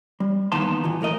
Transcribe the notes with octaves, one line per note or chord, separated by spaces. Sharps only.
G3
D#3 E3 A#3 B3 A5 C6
A#2 D#3 E3
B1 A2 A#4 D#5